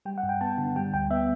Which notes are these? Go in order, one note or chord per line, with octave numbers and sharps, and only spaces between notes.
G3 G5
F#5
G2
G5
B3 A5
D3
G3 G5
D2 G5
B3 E5